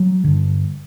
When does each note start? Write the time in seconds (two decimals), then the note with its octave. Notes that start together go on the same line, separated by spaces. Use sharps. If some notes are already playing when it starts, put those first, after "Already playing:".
Already playing: F#3
0.24 G2 D3